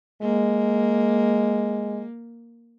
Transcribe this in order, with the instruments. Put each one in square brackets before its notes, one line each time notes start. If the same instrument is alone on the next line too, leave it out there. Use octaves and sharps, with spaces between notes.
[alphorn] G#3 [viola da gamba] A#3